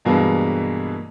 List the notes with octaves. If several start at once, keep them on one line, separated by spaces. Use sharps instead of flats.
G2 B2 E3 G#3 A#3 D4